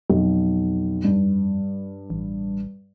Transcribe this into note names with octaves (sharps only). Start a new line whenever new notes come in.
B1 F2
G2
A1